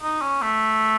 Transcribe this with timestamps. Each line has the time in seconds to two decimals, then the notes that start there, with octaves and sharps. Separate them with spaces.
0.02 D#4
0.22 C#4
0.42 A3